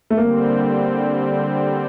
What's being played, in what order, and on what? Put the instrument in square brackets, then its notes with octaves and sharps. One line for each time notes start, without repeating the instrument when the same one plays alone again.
[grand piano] A3
[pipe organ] D3 G3 C4 [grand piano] A#3